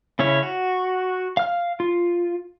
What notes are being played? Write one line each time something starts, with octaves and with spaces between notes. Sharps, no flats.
C#3 C#4 E4 C#5
F#4
F5 F6
F4